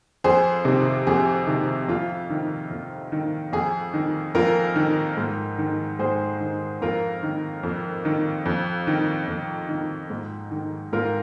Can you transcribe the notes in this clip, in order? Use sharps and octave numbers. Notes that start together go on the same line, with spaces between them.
F2 G#4 C5
C3 D#3
F2 G#4
C3 D#3
F2 F4
D#3
F2
D#3
F2 G#4
D#3
F2 F4 A#4
D#3
G#2
D#3
G#2 G#4 C5
D#3
F2 F4 A#4
D#3
F2
D#3
F2
D#3
F2
D#3
G#2
D#3
G#2 F4 A#4